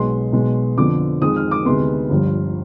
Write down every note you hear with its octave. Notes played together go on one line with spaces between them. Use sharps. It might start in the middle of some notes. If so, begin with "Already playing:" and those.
Already playing: B1 B2 G#3 B3 C6
B1 B2 G#3 B3
F2 D3 F3 B3 D6
F2 D#3 G#3 D#6
F6
D6
D2 C3 D#3 G#3 B3 C6
G1 G2 F3